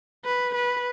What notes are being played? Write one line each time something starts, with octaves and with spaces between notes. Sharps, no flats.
B4
B4